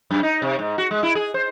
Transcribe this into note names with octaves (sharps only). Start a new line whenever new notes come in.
F#2
D#4
C3
G#2
F#4
G#3
E4
G#4
C5